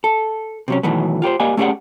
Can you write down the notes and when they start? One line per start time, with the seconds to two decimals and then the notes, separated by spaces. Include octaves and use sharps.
0.04 A4
0.68 C3 F#3 C#4
0.83 B2 D#3 E3 F#3 A3 B3
1.22 F4 G4 B4 C5
1.40 A#3 G4 D5 D#5 F5 G#5
1.57 A3 C#4 G4 G#4 D5 F#5